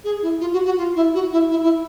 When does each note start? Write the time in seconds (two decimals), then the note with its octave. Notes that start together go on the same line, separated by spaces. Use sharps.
0.04 G#4
0.22 E4
0.41 F4
0.53 F#4
0.65 F#4
0.77 F4
0.96 E4
1.14 F#4
1.32 E4
1.51 E4
1.63 E4